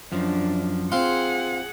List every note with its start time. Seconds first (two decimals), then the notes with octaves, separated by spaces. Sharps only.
0.12 F#2 F3 D4
0.92 C4 F4 G#4 F#5 C6